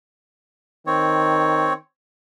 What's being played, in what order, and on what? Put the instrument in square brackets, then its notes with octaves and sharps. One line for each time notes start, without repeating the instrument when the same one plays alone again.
[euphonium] D#3 [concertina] C4 C#5